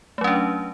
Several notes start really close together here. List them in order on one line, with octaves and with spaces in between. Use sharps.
A3 F#3 C#4 D4